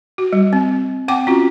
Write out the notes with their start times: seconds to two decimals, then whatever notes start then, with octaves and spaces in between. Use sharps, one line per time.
0.18 F#4
0.33 G3
0.53 C4
1.08 C4 F#5 G5 D6
1.27 C#4 F4 F#4